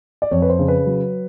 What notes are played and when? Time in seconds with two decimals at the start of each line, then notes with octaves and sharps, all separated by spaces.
0.22 D5
0.31 F2 C#5
0.42 B4
0.50 C5
0.59 C#3
0.68 B4
0.86 F#3